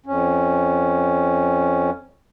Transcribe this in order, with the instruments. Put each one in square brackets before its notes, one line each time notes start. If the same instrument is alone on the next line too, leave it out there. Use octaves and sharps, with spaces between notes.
[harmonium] F2 C#4